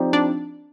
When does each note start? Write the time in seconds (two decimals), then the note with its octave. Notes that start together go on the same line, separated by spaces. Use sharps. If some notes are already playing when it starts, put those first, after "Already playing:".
Already playing: F3 C4 D#4 G4 D5
0.13 D4